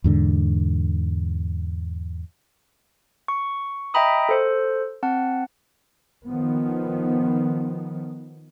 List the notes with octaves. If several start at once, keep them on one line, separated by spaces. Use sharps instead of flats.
E2 G#2 D3
C#6
D#5 E5 G5 A#5 B5 D#6
A4 C5
C4 F#5 A5
D#3 F3 B3